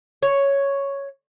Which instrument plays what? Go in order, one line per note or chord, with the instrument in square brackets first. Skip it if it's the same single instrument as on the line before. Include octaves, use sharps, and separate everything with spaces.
[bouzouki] C#5